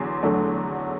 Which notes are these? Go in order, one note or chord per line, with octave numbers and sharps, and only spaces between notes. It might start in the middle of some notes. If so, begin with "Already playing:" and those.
Already playing: E2 D3 F#3 C6
E2 D3 F#3 A3